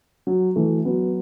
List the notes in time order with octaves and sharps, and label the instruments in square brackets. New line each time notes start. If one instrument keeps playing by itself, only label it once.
[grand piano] F#3
E3 A3
F#3 B3